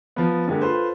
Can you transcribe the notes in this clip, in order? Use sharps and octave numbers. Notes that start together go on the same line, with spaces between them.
F3 B3
D3 G#3 A#3 G4
F4 A4 B4 C5